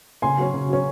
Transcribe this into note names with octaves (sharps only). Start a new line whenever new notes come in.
C#3 G#5 C6
F#3 C#4
C#3
F#3 C#4